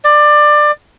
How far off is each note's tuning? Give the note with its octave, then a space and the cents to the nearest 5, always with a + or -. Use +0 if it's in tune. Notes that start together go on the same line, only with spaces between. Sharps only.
D5 +20